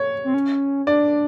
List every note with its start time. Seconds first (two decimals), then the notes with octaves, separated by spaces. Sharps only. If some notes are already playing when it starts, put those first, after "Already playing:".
Already playing: C#5
0.24 C4
0.34 C#4
0.86 D4 D5